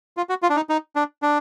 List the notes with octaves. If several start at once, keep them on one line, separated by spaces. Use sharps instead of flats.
F4
F#4
F4
D4
D#4
D#4
D4
D4